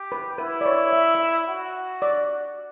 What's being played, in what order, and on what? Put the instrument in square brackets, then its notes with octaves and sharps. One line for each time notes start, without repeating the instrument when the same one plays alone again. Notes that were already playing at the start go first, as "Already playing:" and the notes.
Already playing: [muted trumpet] G4
[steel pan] B4
[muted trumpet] E4 [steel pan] B4
[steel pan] D5
C#5
E5
E5
[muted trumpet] F#4
[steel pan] D5